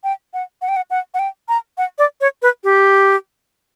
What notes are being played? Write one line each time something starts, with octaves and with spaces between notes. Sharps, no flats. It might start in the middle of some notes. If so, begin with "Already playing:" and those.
G5
F#5
F#5
G5
F#5
F#5
F#5
G5
A#5
F#5
D5
C#5
B4
G4